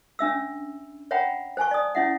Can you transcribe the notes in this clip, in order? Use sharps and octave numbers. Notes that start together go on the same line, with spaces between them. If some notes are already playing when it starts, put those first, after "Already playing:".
C#4 D4 E5 E6
C#5 E5 F#5 G5 A#5 B5
C5 G#5 A5 C#6
D5 D#6
C#4 E4 E5 F#5